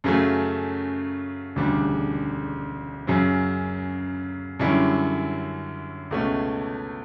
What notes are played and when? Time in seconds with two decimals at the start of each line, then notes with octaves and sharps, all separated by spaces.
0.04 F#2 C#3 F#3 A3
1.56 E1 D2 C#3 G3 D4
3.07 F#2 C#3 F#3
4.59 F#2 D3 G3 C#4 E4
6.11 C#2 B2 A3 C#4